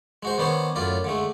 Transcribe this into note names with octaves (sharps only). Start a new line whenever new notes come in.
G#3 F#4 C5
D#3 B3 D4 C5 C#5
F#2 A2 F4 D5
D3 G#3 A3